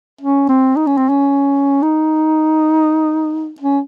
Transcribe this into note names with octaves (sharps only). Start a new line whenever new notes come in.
C#4
C4
D#4
C#4
C4
C#4
D#4
C#4